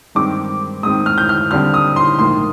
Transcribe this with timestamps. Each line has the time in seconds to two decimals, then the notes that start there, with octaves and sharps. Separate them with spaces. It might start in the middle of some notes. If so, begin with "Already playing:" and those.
0.15 G2 D#3 G#3 C4 D6
0.83 G#2 D#3 G#3 C4 D#6
1.06 F6
1.18 G6
1.29 F6
1.51 D#2 D3 G3 C4 F6
1.74 D#6
1.96 C6
2.19 A#1 G#2 D#3 A#3 C6